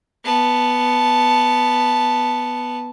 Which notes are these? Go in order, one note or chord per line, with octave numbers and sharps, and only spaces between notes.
B3 A5